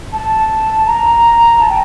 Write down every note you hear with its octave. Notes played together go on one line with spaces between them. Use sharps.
A5
A#5
A5
G5